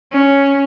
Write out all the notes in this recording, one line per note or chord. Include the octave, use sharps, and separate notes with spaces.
C#4